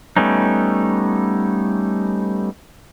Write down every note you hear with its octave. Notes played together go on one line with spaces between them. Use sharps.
G3 A3 B3 C#4 D#4